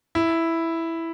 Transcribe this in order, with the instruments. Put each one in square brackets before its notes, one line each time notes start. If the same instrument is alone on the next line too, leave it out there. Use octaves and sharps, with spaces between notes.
[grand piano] E4